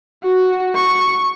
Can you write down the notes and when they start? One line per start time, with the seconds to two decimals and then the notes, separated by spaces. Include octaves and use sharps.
0.23 F#4
0.75 C#6